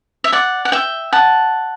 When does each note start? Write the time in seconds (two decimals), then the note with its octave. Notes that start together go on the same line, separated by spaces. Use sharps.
0.24 E5
0.33 D5 F#5
0.65 F#5
0.72 E5 G5
1.12 F#5 A5